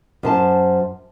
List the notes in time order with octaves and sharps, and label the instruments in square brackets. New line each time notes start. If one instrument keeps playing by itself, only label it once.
[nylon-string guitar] F#2 C5 A5